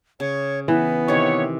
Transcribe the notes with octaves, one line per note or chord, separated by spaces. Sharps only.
C#3 C#5
E3 B3
C3 D#3 C#5